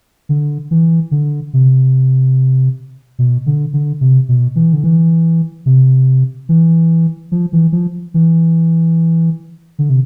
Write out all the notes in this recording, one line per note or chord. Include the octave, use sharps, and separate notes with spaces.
D3
E3
D3
C3
B2
D3
D3
C3
B2
E3
D3
E3
C3
E3
F3
E3
F3
E3
D3
C3